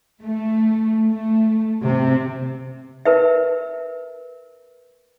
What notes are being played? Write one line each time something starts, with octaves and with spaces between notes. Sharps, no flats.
A3
A3
C3
A#4 B4 E5